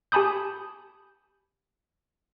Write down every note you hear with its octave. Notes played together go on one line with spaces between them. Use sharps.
G4 G#5 A5 B5 D#6 G6